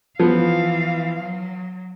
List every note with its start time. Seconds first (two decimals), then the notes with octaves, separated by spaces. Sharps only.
0.19 E3 F3 B3 F5
1.21 F#3